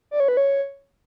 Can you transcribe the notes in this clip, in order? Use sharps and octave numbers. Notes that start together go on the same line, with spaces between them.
D5
C#5
B4
C#5